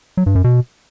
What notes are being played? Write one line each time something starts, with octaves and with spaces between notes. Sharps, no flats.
F#3
G2
F#2
B2